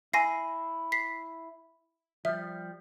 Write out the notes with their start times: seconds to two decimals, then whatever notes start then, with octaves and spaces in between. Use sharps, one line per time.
0.13 E4 G#5 A#6 C7
0.92 B6 C7
2.25 F3 G3 E5